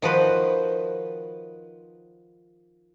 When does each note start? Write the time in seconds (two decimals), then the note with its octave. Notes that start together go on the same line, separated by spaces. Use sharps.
0.02 D#3 F3 F#4 B4 C5